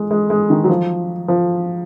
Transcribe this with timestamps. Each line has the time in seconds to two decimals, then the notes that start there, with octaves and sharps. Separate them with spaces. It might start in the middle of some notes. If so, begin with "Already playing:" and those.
Already playing: G#3
0.11 G#3
0.30 G#3
0.50 D#3
0.64 F#3
0.70 F3
1.28 F3